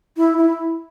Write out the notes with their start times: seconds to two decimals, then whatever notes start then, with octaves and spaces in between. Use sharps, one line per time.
0.17 E4
0.38 E4